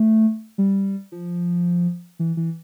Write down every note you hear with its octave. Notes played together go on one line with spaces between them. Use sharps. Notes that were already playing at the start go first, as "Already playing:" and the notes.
Already playing: A3
G3
F3
E3
E3